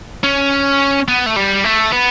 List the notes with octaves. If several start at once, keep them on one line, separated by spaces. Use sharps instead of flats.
C#4
B3
A3
G3
A3
B3